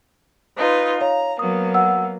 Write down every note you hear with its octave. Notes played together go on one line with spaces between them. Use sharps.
D#4 F4 B4
C#5 F5 A#5
F#3 A#3 B3 D#6
F#5 E6